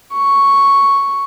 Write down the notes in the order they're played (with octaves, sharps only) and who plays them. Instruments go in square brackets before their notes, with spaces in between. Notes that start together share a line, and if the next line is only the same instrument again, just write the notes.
[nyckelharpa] C#6